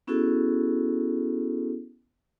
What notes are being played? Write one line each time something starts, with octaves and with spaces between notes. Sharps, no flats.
B3 C#4 E4 F#4 G#4 A4